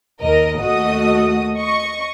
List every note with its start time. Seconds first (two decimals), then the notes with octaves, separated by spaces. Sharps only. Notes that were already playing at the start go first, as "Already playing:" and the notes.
0.21 D#2 A#4 D#5
0.61 D#2 A3 F#4 D#5 D#6
1.55 D#5 C#6